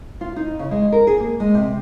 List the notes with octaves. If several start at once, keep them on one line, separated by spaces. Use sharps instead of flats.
F4
D#4
C#3
G#3
A#4
G#4
A#3
G#3
C3